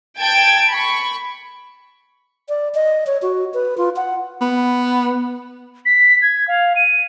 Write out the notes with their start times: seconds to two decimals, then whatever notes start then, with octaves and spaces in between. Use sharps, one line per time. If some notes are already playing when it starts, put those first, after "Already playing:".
0.19 G5 A5 G#6 D7
0.71 B5 C#6
2.49 D5
2.75 D#5
3.07 C#5
3.22 F#4
3.54 B4
3.78 F4
3.96 F#5
4.41 B3
5.86 B6
6.22 G#6
6.48 F5
6.76 D#7